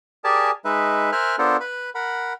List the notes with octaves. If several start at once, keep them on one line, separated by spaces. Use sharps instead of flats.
G4 G#4 A#4 D5 G#5 A5
G#3 D#4 B4 E5
A#4 C5 E5 G#5 F6 F#6
B3 D4 F4 A4 A#4 C5
B4 B5
A#4 F#5 B5